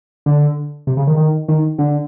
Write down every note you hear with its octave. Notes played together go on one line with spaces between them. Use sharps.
D3
C3
C#3
D#3
D#3
D#3
D3